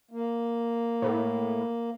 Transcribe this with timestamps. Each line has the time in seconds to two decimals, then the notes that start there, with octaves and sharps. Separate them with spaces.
0.11 A#3
1.02 A2